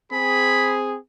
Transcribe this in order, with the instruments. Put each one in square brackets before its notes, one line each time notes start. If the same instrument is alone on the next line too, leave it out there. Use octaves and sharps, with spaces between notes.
[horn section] C4 G#4 [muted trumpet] B5